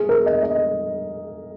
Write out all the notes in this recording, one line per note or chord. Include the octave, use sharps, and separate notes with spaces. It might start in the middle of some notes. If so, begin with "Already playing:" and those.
Already playing: G#4
A#4
D#5
D#5